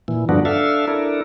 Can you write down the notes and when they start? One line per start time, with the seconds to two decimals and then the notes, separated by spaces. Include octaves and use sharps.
0.08 A#2 E3
0.29 G2 D3 F3 B3 D4 F#4
0.45 D4 A4 E5 F5
0.87 D4 E4 A4 A#4